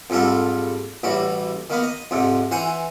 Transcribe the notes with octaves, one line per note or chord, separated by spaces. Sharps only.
F2 G#2 G3 F4 A4
A1 G3 F#4
D#3 A#3 B3
D#5
F2 G#2 C3
E3 C5 F#5 G#5